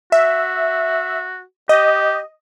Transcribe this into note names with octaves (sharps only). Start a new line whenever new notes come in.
F#4 E5
G4 D#5